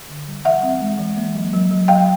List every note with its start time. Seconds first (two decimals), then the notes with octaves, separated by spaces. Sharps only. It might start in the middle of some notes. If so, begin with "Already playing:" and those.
0.09 D3
0.28 G3
0.45 E3 E5 F#5
0.63 C4
0.81 G#3
0.98 E3
1.17 A#3
1.35 F#3
1.53 F#3
1.71 F#3
1.88 F#3 F5 G5